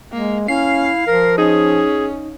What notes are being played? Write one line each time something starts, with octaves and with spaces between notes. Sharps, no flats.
G#3 A#3
C#4 E4 F5 C7
F3 A#4
C#4 D#4 G#4